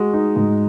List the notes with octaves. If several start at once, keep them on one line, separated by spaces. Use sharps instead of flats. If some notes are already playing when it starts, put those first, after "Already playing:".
Already playing: G#3 F#4
D#4
G#2